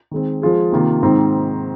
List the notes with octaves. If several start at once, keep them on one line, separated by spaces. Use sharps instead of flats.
D#3 G#3 C4
F3 G#3 F4 G#4
C3 D#3 A#3 F4
G#2 D#3 C4